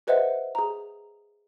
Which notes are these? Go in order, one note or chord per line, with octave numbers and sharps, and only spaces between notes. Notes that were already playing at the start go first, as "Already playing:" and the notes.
G#4 B4 C5 D#5 E5 F#5
G#4 A#5